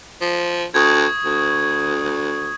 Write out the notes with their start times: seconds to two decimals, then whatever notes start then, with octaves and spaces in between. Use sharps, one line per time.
0.21 F3
0.74 D2 C#6 D#6 G#6
1.25 D2